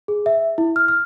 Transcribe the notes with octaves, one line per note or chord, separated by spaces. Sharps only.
G#4
E5
E4
F6
F6